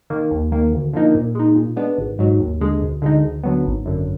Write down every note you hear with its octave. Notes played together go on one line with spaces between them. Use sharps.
D#3 A#3
D#2
D#3 A#3
D2
D3 F3 A#3 D#4
A#2
G#3 D#4
A#2
G#3 B3 D4
G#1
G#2 F#3
D#2
D3 G#3
D2
D3 G#3 D#4
D2
D3 F#3 B3
G#1
F#2 D3